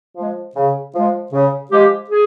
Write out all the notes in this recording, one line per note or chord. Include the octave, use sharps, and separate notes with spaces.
F3 G#3
C#3
F3 G#3
C#3
F3 G#3 G4
G#4